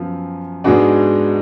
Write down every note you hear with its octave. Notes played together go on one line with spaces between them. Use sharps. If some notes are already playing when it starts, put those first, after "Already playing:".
Already playing: F#2 F3 B3
G#2 G#3 B3 D4 F#4